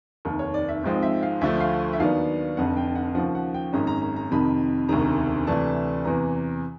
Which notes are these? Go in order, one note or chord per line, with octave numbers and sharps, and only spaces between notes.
F1 D#2 D#3 A#4
C#5
D5
E5
G#1 G#2 F3 G#3 C4
E5
F5
D2 D3 F3 A3 E5
F5
E5
D#2 D#3 F#3 B3 D4 F5
F1 F2 D3 F#5
G5
F#5
D#2 C#3 F3 F#5
F#5
G5
G#1 F#2 D#3 G#3 C#4 A#5
A#5
A#5
A#5
F2 C3 D#3 B5
E1 D2 C3 D#3 A#5
D2 C3 E3 A3 D4 A5
E2 C3 E3 A#5